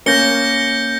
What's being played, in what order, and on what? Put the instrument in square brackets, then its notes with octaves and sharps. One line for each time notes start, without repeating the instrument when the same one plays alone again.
[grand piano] A#3 C#4 [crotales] G6 A#6 C#7 G7